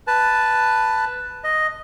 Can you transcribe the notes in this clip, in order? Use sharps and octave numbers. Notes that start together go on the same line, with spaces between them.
B4 A5
D#5